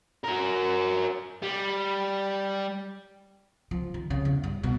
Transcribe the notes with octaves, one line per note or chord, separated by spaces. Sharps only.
F#4 A#4
G3
F3
D#3
C#3
E2
G2
B2